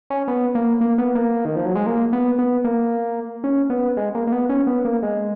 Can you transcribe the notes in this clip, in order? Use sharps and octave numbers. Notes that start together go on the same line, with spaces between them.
C#4
B3
A#3
A#3
B3
A#3
D#3
F3
F#3
G#3
A#3
B3
B3
A#3
C#4
B3
G#3
A#3
A#3
B3
C#4
B3
A#3
G#3